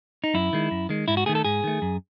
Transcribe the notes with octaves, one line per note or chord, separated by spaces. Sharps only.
D#4
F#2 E4
D#3 G#3
F#2
D#3 G#3
G#2 E4
F#4
D#3 A3 G#4
A4
G#2 G#4
D#3 A3
F#2